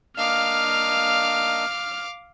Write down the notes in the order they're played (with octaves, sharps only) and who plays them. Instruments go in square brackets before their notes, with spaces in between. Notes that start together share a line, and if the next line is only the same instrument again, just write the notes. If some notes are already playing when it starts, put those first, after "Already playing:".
[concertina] A#3 D4 D#5 [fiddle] F5 D6 [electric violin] F6